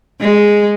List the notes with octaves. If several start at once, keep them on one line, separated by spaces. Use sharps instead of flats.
G#3